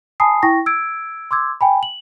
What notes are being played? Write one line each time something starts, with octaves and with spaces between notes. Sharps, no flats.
G#5 A5 B5 D#6 C7
E4 G5 C#6 A#6
E6 G#6 D7
C6 D6 E6 G#6
G5 G#5 B5
F#7